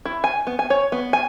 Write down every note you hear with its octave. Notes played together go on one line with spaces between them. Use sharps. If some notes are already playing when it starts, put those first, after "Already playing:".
E4
G#5
B3
G#5
C#5
B3
G#5